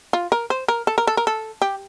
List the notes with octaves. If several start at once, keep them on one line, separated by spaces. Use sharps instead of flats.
F4
A#4
C5
A#4
A4
A#4
A4
A#4
A4
G4